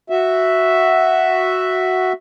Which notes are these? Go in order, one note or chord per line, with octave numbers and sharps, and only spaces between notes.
F#4 E5